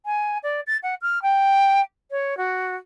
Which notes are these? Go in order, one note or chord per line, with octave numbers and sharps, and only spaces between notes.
G#5
D5
A6
F#5
F6
G5
C#5
F#4